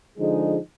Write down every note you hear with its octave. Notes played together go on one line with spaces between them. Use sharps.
D3 F3 G#3 D#4 G#4